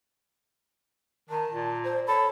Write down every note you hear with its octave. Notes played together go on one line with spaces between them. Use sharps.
D#3 A5
A#2
C5
A4 C#5 B5